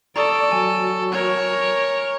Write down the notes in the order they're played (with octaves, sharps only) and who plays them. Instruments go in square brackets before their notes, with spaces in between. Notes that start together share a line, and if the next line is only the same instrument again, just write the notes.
[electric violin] A4 [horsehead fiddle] D5 [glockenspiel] A#5 C#6 D#6
[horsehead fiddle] F#3 [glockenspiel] G#5
[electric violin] A#4 C#5